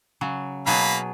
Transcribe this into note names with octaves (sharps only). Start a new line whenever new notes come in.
C#3 F#3
B2 F#3 A#3 G#4 F5 B5